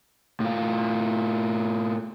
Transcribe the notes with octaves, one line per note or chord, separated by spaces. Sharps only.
A2 F4